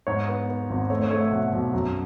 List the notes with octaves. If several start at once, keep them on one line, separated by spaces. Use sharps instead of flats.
G#2 C#5
B3
B3
G#1
A3 C#5
C#5
A3 C#5
E5
B1 F#5
B1
F#2